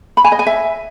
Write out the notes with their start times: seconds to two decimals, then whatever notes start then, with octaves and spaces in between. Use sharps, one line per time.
0.17 B5
0.24 G#5
0.32 D#5
0.39 G#5
0.46 E5